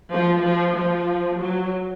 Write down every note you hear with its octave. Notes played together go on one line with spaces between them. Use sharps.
F3
F3
F3
F#3